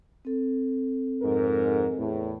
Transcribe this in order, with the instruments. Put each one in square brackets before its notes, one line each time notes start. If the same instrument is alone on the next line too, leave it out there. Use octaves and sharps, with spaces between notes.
[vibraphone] C4 A4
[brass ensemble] F2 G#2 A#4
E2 A2